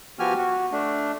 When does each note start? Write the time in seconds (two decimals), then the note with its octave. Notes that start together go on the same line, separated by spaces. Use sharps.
0.19 F3 B3 F#4 G4 G#5 F6
0.37 F#4
0.72 A3 D4